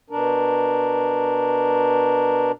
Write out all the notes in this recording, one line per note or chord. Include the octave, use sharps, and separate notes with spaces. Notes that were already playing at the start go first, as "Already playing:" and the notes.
B2 D4 A#4